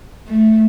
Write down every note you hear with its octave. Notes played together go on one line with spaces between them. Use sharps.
A3